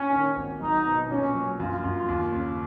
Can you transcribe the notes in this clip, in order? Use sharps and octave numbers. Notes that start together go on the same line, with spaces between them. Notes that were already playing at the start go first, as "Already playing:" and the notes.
Already playing: A#2 C#4
D#3
G#1
F#3 D#4
B2
A#2 C#4
F#3
F#2 F4
F#2
D#2
C#3